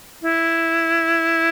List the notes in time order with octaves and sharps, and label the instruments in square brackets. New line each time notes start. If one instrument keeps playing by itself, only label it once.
[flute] E4